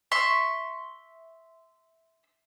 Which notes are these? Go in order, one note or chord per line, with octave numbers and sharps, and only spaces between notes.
E5 C6 C#6